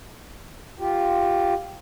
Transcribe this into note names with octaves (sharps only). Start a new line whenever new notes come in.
F4 G4